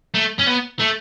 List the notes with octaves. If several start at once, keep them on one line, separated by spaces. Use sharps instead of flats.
A3
C#4
B3
A3